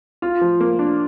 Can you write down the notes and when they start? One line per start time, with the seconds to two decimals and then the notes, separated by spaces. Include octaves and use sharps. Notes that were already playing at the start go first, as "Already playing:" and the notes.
0.22 F4
0.41 F3
0.60 A#3
0.79 D4